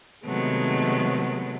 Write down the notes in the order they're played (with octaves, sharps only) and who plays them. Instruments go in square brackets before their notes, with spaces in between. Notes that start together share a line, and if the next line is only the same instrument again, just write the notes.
[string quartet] C3 D#3 F#3 G#3 A3 B3